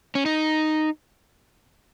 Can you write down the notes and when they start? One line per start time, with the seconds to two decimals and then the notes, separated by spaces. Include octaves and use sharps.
0.15 C#4
0.26 D#4